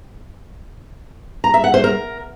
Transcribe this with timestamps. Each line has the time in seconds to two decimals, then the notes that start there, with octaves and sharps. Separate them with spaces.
1.44 A#5
1.54 E5
1.64 F#5
1.74 C5
1.84 A#4